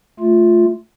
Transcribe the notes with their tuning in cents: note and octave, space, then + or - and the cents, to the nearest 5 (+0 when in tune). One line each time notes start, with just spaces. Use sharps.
A3 +0 F4 +0